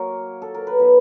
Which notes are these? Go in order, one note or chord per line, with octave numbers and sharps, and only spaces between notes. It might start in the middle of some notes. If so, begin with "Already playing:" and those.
Already playing: F#3 A#3 A#4 C#5
A4
A#4
B4
B2 F#3 B3 B4